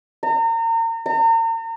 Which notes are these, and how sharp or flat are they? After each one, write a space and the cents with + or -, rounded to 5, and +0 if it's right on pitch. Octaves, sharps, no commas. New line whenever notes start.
A#5 -35
A#5 -40